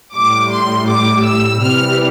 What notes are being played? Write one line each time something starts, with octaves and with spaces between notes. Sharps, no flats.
A2 G3 D6
C6
D6
E6
C3 E3 G3 F6